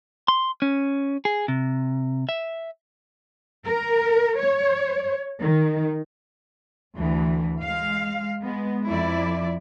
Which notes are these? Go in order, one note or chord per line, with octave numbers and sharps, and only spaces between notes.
C6
C#4
G#4
C3
E5
A#4
C#5
D#3
D2 E3
G#3 F5
G#3 B3
F2 E4 D5